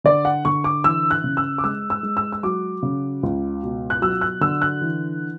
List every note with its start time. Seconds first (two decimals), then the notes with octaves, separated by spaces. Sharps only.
0.04 D3 D5
0.25 F#5
0.45 D3 C#6
0.64 D6
0.84 E3 E6
1.11 F#6
1.24 C#3
1.37 E6
1.58 D6
1.64 G#3 E6
1.90 E6
2.03 G#3
2.17 E6
2.32 E6
2.43 F#3 D6
2.83 C#3
3.23 C#2
3.63 B2
3.90 F#6
4.02 F#3 E6
4.21 F#6
4.41 D3 E6
4.62 F#6
4.82 E3